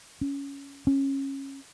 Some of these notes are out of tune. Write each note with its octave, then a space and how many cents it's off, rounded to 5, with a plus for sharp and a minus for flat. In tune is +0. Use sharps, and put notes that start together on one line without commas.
C#4 +10
C#4 -20